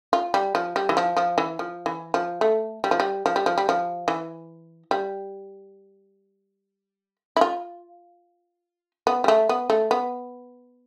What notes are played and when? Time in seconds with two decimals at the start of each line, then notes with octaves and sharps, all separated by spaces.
0.13 F4
0.34 G3
0.55 F3
0.76 G3
0.89 E3
0.97 F3
1.17 F3
1.38 E3
1.59 F3
1.86 E3
2.14 F3
2.41 A3
2.84 G3
2.91 F3
3.00 G3
3.26 F3
3.36 G3
3.46 F3
3.58 G3
3.69 F3
4.08 E3
4.91 G3
7.37 E4
7.41 F4
9.07 B3
9.24 G3
9.28 A3
9.49 B3
9.70 A3
9.91 B3